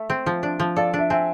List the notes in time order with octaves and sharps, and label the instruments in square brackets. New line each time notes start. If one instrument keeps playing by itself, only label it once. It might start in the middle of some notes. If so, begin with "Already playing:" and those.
Already playing: [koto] A3 [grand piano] E5
[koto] C4
F3
D4
F3
[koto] A4 [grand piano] D5 F5
[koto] D4
[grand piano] E5
[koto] C4 [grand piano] E5 G#5